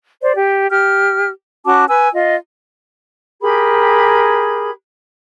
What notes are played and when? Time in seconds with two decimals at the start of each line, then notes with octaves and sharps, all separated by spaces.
0.21 C5 D5
0.35 G4
0.70 G4 F6
1.65 C#4 F#4 A5 D6
1.88 B4 G#5 E6
2.13 F4 D#5
3.41 G4 G#4 A#4 B5